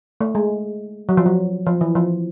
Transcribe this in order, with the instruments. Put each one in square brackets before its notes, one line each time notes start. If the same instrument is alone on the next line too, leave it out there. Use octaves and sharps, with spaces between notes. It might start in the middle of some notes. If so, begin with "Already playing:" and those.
[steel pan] A3
G#3
F#3
F3
F#3
F3
E3
F3